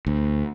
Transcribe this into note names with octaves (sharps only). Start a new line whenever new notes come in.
D2